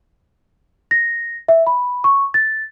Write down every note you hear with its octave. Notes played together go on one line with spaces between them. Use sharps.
A#6
E5
B5
C#6
A6